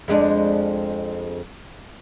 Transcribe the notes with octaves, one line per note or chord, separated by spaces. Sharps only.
F2 G#3 D4